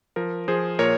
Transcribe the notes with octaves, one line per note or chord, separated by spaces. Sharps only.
F3 A#4
F3 G#4 C5
A#2 A#4 C#5